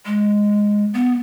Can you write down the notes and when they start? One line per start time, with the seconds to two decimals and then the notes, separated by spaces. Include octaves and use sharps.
0.06 G#3
0.94 B3